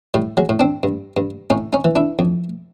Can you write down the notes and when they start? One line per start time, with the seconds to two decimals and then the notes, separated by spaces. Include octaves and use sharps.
0.14 A2 G3
0.37 F#3 G#3
0.49 A2
0.59 C4 D4
0.83 G2
1.17 G2
1.50 A2 C#4 D#4
1.73 C#4 D#4
1.84 E3
1.96 D4 E4
2.19 F2